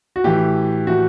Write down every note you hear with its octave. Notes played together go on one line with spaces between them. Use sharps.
F#4
A2 E3 G4
A2 E3 F#4